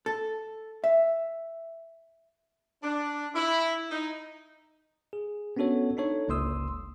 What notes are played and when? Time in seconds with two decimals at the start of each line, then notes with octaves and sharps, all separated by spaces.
0.06 A4
0.84 E5
2.83 D4
3.35 E4
3.90 D#4
5.13 G#4
5.57 B3 C#4 D4 F#4 A4 C#5
5.97 D4 D#4 A4 C#5
6.28 G1 C#2 A#3 C6 D#6 E6